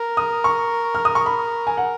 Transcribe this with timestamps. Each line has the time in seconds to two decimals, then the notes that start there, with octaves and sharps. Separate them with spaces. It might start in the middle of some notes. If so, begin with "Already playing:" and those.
Already playing: A#4
0.17 D#6
0.44 C#6
0.95 F6
1.05 D#6
1.15 C#6
1.26 B5
1.67 G#5
1.77 F#5